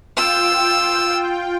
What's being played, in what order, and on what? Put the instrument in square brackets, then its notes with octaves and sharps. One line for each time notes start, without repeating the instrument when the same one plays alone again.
[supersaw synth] F4 G5 [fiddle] E6